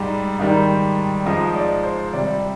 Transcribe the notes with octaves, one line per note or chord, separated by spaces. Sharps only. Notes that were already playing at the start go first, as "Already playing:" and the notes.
Already playing: G#2 G3 D5
G#2 D#3 G3
G#2 F3 G#3 D#5
D#5
D5
C5
C3 G3 D5